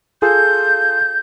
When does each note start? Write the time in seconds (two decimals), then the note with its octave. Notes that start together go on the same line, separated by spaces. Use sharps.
0.22 F4 G#4 A4 G6